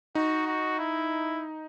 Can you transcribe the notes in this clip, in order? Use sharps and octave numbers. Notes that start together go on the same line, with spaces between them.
D#4 F#4
F#4
E4